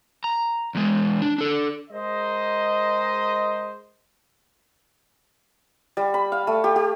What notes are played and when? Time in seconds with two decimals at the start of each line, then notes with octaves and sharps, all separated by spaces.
0.24 A#5
0.75 E2 G#3
1.22 D4
1.38 D4 A4
1.91 G#3 A#4 C5 D#5
5.97 G3
6.14 B5
6.32 F5
6.47 A3
6.64 G4
6.76 G4